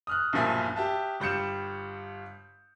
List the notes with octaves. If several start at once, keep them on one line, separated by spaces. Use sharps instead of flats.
D#6 F6 F#6
B1 G2 A#2 F3 E5 G#5
G4 E5 A5
G1 G3 G6 C#7 E7